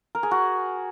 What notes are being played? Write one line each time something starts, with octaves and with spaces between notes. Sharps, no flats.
A#4
G#4
F#4